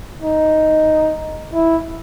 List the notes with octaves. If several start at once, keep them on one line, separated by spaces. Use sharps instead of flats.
D#4
E4